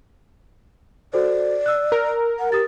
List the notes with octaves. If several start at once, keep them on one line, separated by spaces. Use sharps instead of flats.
F#4 A4 C5 D5
E6 F#6
A#4
F#5
G4 D#6 A6